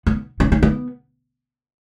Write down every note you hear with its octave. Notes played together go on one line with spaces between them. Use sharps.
B3
C#4
C#4
B3